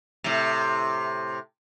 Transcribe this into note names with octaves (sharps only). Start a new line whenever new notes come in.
A2 C3